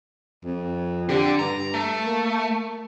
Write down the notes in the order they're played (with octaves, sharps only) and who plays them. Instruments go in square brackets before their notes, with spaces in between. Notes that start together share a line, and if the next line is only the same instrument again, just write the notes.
[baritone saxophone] F2
[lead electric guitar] D3 [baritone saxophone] G4
[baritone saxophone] G2 [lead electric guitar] A#5
[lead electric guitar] A3
[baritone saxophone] A#3